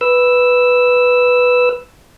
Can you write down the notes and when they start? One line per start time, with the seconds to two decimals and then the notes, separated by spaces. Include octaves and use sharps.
0.01 B4 E6